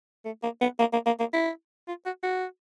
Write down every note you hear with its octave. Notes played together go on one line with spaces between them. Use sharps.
A3
A#3
B3
A#3
A#3
A#3
A#3
E4
F4
F#4
F#4